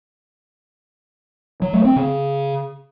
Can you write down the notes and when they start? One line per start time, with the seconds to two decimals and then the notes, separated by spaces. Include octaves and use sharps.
1.62 F#3
1.73 A3
1.85 C4
1.96 C#3